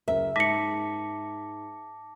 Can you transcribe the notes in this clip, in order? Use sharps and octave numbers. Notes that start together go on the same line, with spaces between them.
F#1 A#4 E5
G#2 A5 D6 A#6 B6 C#7